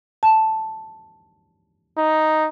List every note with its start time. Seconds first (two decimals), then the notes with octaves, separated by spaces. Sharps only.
0.23 A5
1.98 D#4